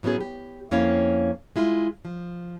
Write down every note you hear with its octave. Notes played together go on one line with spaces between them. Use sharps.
A2 F#3 B3 C#4 G#4
G4
F2 A#3 C#4 E4 C#5 F5
G#3 E4 F4
F3